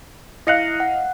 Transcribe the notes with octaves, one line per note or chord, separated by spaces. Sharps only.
E4 D#5 F5 F#6 A#6 C#7
F#5